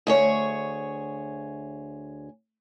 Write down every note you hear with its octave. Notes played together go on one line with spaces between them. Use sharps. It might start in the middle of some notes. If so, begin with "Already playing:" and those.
D2 G#4 C#5